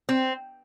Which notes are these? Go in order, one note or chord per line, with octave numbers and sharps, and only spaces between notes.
C4